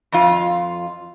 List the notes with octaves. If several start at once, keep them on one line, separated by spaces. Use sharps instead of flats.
F2 F4